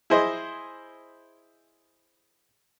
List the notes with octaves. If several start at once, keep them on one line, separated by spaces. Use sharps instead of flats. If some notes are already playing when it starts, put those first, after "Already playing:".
E4 G#4 C5 D#5